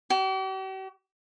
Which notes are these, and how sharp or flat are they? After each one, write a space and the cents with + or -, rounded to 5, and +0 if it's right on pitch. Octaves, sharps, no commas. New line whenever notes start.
G4 -45